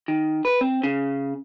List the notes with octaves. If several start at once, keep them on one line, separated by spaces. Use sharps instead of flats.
D#3
B4
C4
C#3